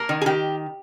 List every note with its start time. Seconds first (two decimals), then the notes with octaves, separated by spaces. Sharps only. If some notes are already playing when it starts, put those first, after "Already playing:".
Already playing: A#3 A#4
0.09 D#3
0.21 G#4
0.26 D#3 G4